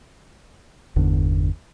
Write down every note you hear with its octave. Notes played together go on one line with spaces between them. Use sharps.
G1 E2 D3